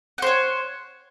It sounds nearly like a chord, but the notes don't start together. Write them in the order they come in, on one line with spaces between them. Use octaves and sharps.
F#5 C5 C#5